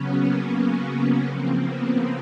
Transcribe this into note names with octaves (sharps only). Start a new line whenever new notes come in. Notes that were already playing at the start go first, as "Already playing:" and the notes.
Already playing: C#3 F#3 B3 C#4
A#3
B3
C#3 F3 A#3 C4
B3